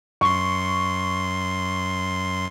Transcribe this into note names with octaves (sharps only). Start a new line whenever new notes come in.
F#2 C6 C#6